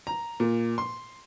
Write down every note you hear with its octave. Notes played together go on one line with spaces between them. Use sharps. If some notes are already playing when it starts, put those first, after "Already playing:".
A#5
A#2
C6